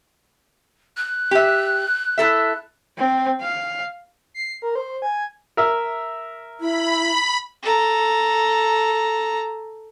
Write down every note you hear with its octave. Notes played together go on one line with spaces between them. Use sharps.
F#6
G4 E5
E4 A4 E5
C4
F5
C7
A#4
C5
G#5
A#4 E5
E4 B5
A4 A#5